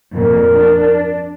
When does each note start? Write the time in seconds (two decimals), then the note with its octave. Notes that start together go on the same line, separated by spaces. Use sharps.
0.15 F2 A#2 A#4
0.57 D4